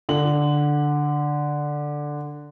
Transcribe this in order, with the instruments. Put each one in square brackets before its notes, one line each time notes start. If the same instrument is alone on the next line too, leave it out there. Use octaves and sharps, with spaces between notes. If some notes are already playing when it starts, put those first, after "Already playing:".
[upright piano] D3 F#7